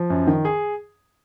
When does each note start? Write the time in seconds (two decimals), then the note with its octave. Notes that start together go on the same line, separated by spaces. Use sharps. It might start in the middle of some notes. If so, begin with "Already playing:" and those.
Already playing: F3
0.10 F#2
0.27 D#3
0.45 G#4